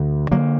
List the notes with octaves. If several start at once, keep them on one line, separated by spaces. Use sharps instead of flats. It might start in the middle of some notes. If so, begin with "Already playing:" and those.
Already playing: D2 D3
D3 F#3 A#3